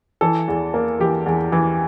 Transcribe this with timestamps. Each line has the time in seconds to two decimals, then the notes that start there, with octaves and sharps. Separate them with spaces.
0.21 E3 A4
0.48 E2
0.74 A#3
1.00 E3 G4
1.26 E2
1.52 E3